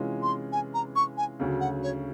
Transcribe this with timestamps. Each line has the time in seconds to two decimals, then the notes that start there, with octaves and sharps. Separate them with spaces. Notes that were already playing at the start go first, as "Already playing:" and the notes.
Already playing: C3 E3 G#3 C#4 F4
0.23 C6
0.52 G#5
0.74 A#5
0.96 C#6
1.17 G#5
1.40 D2 C#3 F#3
1.60 F#5
1.83 C#5